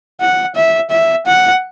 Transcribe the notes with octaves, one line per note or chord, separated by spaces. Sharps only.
F#5
E5
E5
F#5